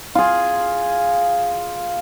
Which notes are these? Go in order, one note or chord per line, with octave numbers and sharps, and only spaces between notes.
F4 G#4